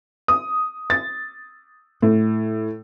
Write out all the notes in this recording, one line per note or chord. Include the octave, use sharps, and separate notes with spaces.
D#6
A6
A2